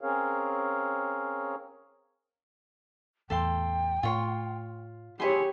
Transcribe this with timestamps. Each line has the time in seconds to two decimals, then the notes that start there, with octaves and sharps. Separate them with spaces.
0.01 C4 C#4 G#4 A#4 C#5 F5
3.30 E2 A2 A4 F5 G5 C6
4.03 A2 A3 F4 C#5 C6
5.20 E4 G4 G#4 C#5 G#5 C6